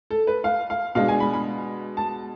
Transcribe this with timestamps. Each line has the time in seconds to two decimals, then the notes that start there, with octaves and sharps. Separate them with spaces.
0.10 A4
0.27 B4
0.44 F5
0.70 F5
0.95 B2 G#3 D4 F5
1.08 G#5
1.20 B5
1.33 B5
1.97 A5